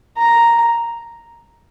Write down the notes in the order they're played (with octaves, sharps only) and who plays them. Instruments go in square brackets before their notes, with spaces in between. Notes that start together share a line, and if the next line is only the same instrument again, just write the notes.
[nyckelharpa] A#5